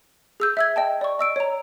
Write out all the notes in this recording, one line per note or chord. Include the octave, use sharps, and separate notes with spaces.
G#4 E6 G6
E5 E6 G#6
D#5 G5 A5
D5 C#6
D#5 E6 D7
C#5 A#5